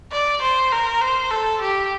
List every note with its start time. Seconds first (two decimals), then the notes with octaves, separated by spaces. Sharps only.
0.12 D5
0.42 C5
0.72 A#4
1.01 C5
1.31 A4
1.61 G4